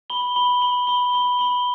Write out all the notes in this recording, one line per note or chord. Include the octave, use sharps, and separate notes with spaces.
B5 G7
B5 G7
B5 G7
B5 G7
B5 G7
B5 G7